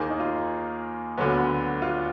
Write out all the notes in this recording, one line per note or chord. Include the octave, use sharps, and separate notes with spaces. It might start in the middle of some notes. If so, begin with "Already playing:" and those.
Already playing: D#2 D#3 A#3 G#4
D#4
F4
D2 D3 F#3 B3
F4